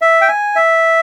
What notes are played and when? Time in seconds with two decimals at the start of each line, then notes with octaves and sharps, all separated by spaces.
0.02 E5
0.21 G5
0.29 G#5
0.56 E5